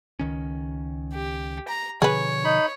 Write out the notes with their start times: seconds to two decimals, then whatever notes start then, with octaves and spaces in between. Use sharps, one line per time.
0.19 C#2 D#3 C#4
1.13 G4
1.68 A#5
2.02 B2 D3 F3 G#4 B4 C#5
2.44 D#4 B5